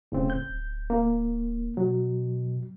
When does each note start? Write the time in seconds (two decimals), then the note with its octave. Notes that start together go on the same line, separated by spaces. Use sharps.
0.12 D#1 A2 C#3 C4
0.30 G6
0.48 D1
0.90 A#3
1.77 B2 F#3